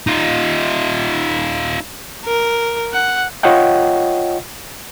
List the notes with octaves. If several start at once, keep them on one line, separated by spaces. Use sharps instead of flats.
D#4 F4
A#4
F#5
F4 C#5 D#5 F#5 G5